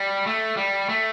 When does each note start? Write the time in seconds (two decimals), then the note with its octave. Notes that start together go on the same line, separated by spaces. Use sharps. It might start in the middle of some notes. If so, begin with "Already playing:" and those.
Already playing: G3
0.27 A3
0.57 G3
0.89 A3